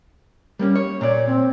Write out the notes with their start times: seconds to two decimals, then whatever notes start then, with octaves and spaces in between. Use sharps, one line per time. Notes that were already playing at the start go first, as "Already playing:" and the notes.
0.59 G3 A#3 C#4
0.75 C#5
1.01 A#2 C#5 D5
1.27 C4